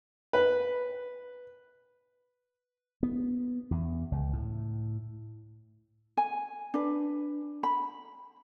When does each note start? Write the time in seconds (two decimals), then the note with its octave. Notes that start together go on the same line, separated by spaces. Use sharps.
0.33 B4
3.03 B3
3.71 E2
4.12 C#2
4.33 A2
6.17 G#5
6.74 D4 B4
7.63 B5